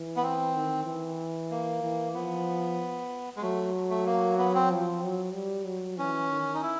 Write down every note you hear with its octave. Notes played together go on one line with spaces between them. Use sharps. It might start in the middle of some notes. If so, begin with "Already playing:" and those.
Already playing: E3
B3
C4
D#3
E3
A#3
E3
F3 B3
G#3
F#3 A3
A3
A#3
B3
C4
F3
F#3
G3
F#3
E3 C#4
D#3
D#4
E4